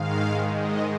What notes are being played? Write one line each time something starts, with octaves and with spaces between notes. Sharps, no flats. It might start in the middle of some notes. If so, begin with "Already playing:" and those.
Already playing: G#2 D#3 G#3 F5
D#5